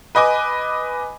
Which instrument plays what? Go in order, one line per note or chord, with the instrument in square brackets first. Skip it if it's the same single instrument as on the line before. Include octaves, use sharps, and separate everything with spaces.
[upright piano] B4 D#5 G#5 D6